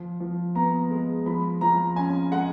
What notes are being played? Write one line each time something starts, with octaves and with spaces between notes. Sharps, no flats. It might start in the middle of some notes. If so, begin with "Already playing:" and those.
Already playing: F3
F3
B3 A#5
G#3
F3 B5
F3 A#5
C#4 G#5
G#3 F#5